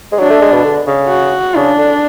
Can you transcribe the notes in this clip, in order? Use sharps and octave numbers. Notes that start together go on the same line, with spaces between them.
G#3
F#3 D4
A3
G#3
B2
D3
C#3
F#4
C#3 D4
D3